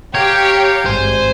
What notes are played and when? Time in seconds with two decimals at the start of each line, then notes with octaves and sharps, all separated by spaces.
0.15 G4 C#5 F5 G5 A#5
0.86 G#1 G2 C5 G#5